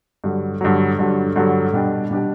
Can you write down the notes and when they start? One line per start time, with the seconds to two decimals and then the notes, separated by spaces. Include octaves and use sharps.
0.24 G2 D3 F#3
0.61 G2 D3 F#3
0.99 G2 D3 F#3
1.36 G2 D3 F#3
1.73 B2 G3 D4 G4
2.11 B2 G3 D4 G4